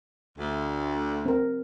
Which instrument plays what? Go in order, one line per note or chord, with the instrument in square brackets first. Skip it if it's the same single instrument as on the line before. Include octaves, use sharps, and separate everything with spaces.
[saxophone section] D2
[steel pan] C4 A#4